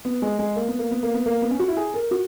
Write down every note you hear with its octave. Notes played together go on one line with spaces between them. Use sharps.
B3
G#3
G#3
A#3
B3
A#3
B3
A#3
B3
A#3
B3
C#4
F#4
E4
G#4
A#4
F#4